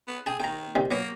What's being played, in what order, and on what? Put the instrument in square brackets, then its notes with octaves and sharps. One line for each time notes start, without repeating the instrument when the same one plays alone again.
[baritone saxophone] B3
[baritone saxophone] G#4 [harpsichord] G5 A5
[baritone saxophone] D#3 [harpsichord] G5 A#5
[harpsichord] D#3 G3 C4
[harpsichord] F#3 B3 [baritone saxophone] A#3